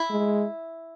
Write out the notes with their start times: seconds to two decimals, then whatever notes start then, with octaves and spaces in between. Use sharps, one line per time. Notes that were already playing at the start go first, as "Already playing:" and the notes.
Already playing: E4
0.10 G#3